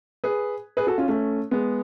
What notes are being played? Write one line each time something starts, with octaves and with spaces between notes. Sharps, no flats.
G#4 B4
G#4 B4
F#4 A4
C#4 F4
A3 C#4
G#3 B3